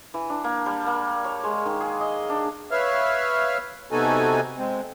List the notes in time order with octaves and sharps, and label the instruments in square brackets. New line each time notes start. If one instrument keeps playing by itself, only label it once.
[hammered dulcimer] E3
D4
A#3
G3
A#3
C#5
G#3
D#3
G#4
D#5
D4
[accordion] B4 C#5 E5 F5 F6
C3 B3 D#4 F#4 A4 G#5
G#3 C4